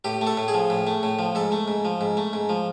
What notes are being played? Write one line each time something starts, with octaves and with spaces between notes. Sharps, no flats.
A2 G4
A3
A4
A2
G#4
F3
A2
A3
A2
F3
G#2 A4
A3
G#2
F3
G#2
A3
G#2
F3